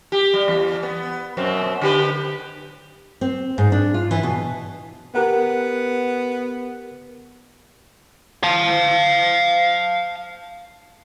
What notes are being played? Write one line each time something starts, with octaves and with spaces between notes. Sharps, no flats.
G4
G3
E2
B3
F#2 B2 C4
D3 G4 B4
C4
G#2
D4
F4
E3
B2
B3 G4 A#4 F#5
F5 A5